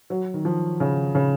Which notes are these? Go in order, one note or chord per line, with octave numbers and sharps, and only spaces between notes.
F#3
D#3
F3
C#3
C#3